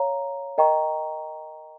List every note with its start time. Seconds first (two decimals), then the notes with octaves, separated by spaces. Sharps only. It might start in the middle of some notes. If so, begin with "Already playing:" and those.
Already playing: C#5 F5 A#5
0.58 A#4 D#5 G5 A#5 C#6